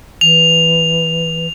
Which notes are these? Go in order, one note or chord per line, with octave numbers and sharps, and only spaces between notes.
E3 F7